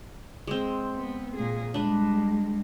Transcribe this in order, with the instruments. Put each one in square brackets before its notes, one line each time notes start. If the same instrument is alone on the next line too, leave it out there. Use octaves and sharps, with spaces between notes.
[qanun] G#3 C4
[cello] B3
A#2 G#4
[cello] G3 G#3 [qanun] D4 B4